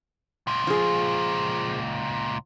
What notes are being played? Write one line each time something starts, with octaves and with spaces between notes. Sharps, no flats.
C#2 A#2
F3 G#4